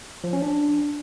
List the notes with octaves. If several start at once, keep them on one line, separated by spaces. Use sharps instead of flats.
F3
C#4
D4